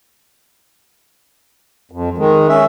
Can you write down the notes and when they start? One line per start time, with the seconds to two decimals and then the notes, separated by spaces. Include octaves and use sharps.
1.92 F2
2.18 D#3 G#3
2.49 C#4 E5